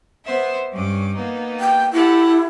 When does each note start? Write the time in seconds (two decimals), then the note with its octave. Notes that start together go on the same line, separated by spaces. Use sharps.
0.25 B3 C5 E5
0.72 G2 C#4 D6
1.15 A#3 B3 D#4
1.60 G5
1.93 E4 G4 A4 F#5